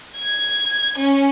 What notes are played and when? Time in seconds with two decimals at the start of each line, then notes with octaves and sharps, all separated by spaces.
0.16 G#6
0.98 C#4